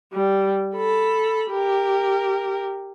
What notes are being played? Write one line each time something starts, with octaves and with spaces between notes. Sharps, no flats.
G3
A4 B5
G4 A#4